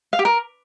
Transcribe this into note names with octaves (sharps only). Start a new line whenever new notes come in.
F5
G4
A#4